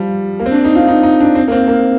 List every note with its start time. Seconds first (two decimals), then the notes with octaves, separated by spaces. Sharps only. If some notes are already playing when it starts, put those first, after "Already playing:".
Already playing: F3 G3
0.39 A#3
0.46 C4
0.52 D4
0.64 D#4
0.75 F4
0.88 D#4
1.03 D#4
1.20 D4
1.35 C4
1.48 A#3
1.52 C4
1.68 A#3